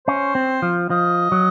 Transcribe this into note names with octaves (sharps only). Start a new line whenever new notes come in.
C#4 C5
C4
F3
F3 D#5
F#3